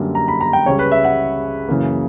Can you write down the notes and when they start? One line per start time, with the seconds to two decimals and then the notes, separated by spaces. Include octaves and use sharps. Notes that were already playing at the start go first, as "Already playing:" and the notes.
Already playing: F#2 D3 G3 A#3
0.15 A#5
0.28 B5
0.41 A#5
0.53 G5
0.66 C#2 C#3 G3 C#5
0.79 B4
0.92 E5
1.05 F#5
1.68 F#2 C#3 E3 A#3